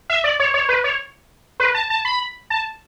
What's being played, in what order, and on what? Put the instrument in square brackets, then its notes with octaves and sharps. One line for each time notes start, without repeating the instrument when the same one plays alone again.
[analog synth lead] E5
D5
C#5
C#5
B4
C#5
B4
A5
A5
B5
A5